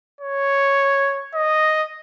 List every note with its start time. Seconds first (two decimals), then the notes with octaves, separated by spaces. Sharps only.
0.21 C#5
1.35 D#5